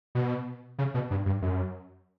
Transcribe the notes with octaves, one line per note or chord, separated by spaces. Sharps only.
B2
C#3
B2
G2
G2
F#2